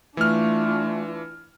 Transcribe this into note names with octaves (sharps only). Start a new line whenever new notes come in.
E3 A3 D4 F4 F6